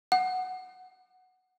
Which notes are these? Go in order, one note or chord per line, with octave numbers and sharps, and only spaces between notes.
F#5